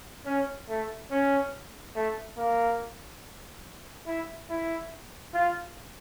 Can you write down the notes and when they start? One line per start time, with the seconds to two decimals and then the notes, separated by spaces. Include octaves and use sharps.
0.26 C#4
0.69 A3
1.11 C#4
1.95 A3
2.38 A#3
4.07 E4
4.49 E4
5.34 F4